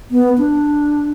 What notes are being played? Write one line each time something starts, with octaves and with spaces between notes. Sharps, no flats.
B3
D4